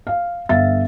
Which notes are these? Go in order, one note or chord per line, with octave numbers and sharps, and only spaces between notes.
F5
G1 E5 F5 A6